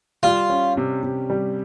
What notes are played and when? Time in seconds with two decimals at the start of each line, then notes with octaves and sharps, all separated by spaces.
0.23 G3 F4
0.50 C#4
0.77 C3
1.03 C3
1.30 G3